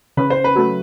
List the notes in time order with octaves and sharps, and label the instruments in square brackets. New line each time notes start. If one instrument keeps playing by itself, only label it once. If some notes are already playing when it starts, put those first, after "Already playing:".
[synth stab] C#3 [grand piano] B4
[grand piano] C5
B4
[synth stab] F#3 A3